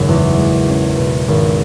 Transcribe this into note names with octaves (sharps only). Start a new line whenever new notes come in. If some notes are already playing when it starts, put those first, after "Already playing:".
Already playing: G#1 F#2 C#3
E2
G#3
C#4
B2
G#1